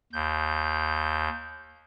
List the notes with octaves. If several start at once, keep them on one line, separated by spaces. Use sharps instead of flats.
D#2 G6